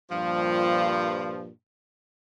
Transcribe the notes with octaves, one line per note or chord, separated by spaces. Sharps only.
G2 A#2 F3